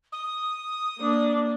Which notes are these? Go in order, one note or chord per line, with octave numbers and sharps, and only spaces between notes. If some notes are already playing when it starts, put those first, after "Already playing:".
D#6
A#3 D4